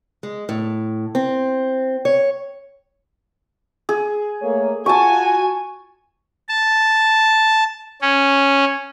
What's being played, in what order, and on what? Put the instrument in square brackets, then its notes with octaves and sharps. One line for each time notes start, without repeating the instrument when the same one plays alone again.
[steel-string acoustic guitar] G#3
A2
C4
C#5
[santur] G#4
[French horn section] A3 A#3 C#5
[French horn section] F4 F#4 [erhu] G#5 [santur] A5 C#6
[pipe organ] A5
C#4